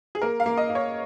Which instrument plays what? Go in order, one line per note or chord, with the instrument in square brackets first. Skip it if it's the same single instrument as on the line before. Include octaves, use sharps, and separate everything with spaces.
[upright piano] G#4
A#3 A#4
F5
A#3
D#5
A#3
C#5